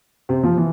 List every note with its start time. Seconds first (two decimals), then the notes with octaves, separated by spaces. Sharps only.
0.29 C3 C4
0.43 F3 F4
0.57 E3